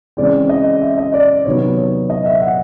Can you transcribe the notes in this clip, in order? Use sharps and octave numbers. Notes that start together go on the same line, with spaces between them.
C#3 E3 G#3 C4 D5
D#5
E5
D#5
D5
C3 D#3 F#3 B3 C#5
C#5
D#5
E5
F#5